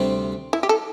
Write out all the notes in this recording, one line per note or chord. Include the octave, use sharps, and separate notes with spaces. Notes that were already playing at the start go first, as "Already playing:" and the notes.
Already playing: D2 C3 G3 C4
E4
G4
A4